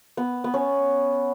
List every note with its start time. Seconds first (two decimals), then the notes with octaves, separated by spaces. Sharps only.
0.17 B3
0.44 B3
0.54 C#4